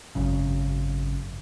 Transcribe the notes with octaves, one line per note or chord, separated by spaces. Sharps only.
G#1 F#2 C#3